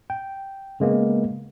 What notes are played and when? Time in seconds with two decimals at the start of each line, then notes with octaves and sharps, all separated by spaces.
0.10 G5
0.80 C#3 G#3 A#3 B3